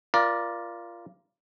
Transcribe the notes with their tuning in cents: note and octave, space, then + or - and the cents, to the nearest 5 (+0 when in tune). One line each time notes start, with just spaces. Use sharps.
F4 -15 A#4 +20 D5 +0